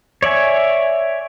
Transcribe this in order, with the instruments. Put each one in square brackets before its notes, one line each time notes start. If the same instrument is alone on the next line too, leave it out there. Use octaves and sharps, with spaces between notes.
[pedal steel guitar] C#5 D5 E5 G#5